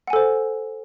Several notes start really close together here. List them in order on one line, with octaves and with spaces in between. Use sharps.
F#5 G#5 A4 C5